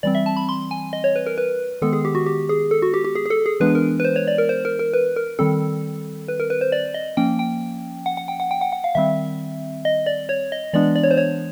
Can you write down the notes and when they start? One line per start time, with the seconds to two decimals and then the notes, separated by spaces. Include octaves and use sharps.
0.03 E3 G3 C4 D5
0.15 E5
0.26 A5
0.37 B5
0.49 C6
0.71 G#5
0.93 D#5
1.04 C#5
1.16 B4
1.26 A#4
1.38 B4
1.82 D#3 G#3 B3 A4
1.93 G#4
2.05 G4
2.15 F#4
2.26 G4
2.49 G#4
2.71 A4
2.82 F#4
2.94 G4
3.04 G4
3.15 G#4
3.26 G#4
3.30 A4
3.46 G#4
3.60 E3 G#3 B3 D4 B4
3.75 A#4
4.00 B4
4.05 C5
4.16 C#5
4.28 D5
4.38 A#4
4.49 C5
4.65 A#4
4.79 A#4
4.93 B4
5.16 A#4
5.39 D#3 G3 C4 A4
6.28 B4
6.40 A#4
6.50 B4
6.61 C5
6.72 D5
6.94 D#5
7.17 F3 A#3 C#4 G5
7.39 G5
8.06 F#5
8.17 F#5
8.28 G5
8.40 F#5
8.51 G5
8.61 F#5
8.72 F#5
8.84 F5
8.95 D#3 G3 C4 E5
9.85 D#5
10.06 D5
10.29 C#5
10.52 D#5
10.73 E3 G#3 B3 D4 D5
10.96 D5
11.03 C#5
11.11 C5
11.17 C#5